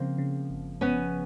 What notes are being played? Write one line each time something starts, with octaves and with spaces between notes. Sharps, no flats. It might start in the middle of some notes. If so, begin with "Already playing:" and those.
Already playing: C#3 F3 A#3 C4
C#3
G1
G1 B3 C#4